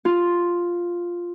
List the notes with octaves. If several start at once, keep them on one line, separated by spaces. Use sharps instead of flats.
F4